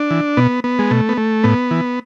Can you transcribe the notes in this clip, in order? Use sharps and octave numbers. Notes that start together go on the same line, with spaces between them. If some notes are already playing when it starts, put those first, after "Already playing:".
Already playing: D4
E3
B2 B3
B3
G#3
B2 A3
B3
A3
A2 B3
E3